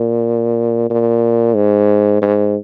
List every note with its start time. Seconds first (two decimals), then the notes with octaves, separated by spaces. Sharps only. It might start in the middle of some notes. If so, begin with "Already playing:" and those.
Already playing: A#2
0.90 A#2
1.55 G#2
2.22 G#2